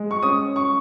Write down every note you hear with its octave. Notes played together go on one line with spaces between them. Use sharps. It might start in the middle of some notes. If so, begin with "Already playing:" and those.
Already playing: G#3
C#6
C#4 D#6
C#6